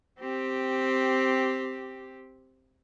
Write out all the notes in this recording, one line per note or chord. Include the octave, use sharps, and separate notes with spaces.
C4 G4